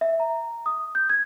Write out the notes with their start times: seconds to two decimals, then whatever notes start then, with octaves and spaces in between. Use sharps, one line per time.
0.01 E5
0.20 A#5
0.66 D#6
0.95 G6
1.10 G#6